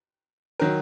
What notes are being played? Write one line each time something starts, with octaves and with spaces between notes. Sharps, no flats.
D#3 F#3 A#4